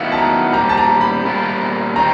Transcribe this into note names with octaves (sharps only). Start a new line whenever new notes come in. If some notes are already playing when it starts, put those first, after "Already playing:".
Already playing: D#3 F#3 B3 E4 F5 F#5
A5
A#5
A#2 G3 C4 A#5
A5
A#5
B5
A#2 G3 C4 F4 A#4
D#3 G3 C4 A#5